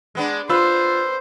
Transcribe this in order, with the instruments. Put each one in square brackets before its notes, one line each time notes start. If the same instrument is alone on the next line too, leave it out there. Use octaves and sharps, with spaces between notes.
[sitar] G#3 B3 D4
[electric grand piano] F4 E6 [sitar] B4 [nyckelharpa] C5